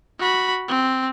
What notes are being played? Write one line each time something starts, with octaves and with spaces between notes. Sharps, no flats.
F#4 B5
C4